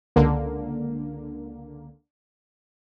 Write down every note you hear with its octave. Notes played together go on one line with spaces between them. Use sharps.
C#2 D3 A#3